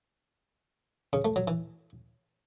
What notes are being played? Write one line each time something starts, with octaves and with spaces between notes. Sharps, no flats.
C#3
A3
F#3
E3